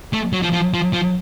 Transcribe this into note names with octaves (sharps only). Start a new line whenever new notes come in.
A3
F#3
F3
F3
F3
F3